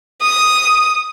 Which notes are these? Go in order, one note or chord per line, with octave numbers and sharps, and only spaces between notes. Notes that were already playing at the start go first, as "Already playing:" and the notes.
D#6